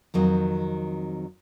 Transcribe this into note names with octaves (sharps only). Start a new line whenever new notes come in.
F2 D#3 F#3 C4